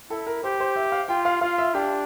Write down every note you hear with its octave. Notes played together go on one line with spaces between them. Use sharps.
E4 A4
A#4
G4 C5
C5
E5
F5
F4 G5
F5
F4 F5
E5
D4 G4